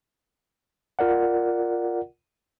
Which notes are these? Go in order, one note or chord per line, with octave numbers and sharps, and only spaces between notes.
F4 A#4 D5 F#5